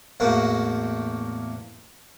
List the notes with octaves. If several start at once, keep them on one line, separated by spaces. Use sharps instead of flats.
A1 E2 A#3 F#4